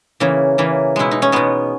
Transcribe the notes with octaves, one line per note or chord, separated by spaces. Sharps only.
C#3 E3 A#3
C#3 E3 A#3
B2 G#3 E4
D#4
C#4
B2 G#3 B3